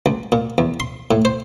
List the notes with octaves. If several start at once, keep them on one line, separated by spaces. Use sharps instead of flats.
C#2
A#2
E2
C6
A2
C5